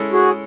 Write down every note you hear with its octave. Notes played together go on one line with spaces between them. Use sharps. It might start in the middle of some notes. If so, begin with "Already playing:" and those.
Already playing: G#3 C#4 E4 A4
F#4 G#4